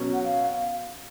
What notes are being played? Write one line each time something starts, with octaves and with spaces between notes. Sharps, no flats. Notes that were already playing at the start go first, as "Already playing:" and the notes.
Already playing: B2 F#3 C#4
F#5
F5